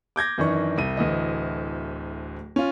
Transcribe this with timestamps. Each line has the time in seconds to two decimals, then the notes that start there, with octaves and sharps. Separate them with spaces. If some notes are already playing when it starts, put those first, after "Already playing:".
0.16 D6 G6 G#6 A#6
0.38 F#2 D#3 E3 D4 C#6
0.78 C2 D#7
0.97 D1 D2 E3 D#5
2.56 C#4 F4